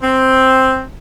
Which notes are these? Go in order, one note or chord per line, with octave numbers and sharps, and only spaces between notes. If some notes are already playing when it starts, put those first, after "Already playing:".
C4